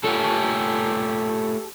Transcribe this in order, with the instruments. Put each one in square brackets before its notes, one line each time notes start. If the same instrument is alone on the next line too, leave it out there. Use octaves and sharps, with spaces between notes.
[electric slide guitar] A3 F4 C#5 [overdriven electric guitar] G4 A4